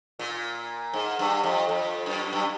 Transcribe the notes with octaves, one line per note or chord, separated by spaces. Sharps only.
A#2
G#2
G2
F2
F2
F#2
G2